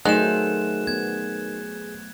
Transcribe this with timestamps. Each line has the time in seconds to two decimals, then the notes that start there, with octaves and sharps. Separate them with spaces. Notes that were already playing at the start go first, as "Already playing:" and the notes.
0.05 D#3 F#3 A3 G#4 C5 F#6 E7
0.87 B3 G#6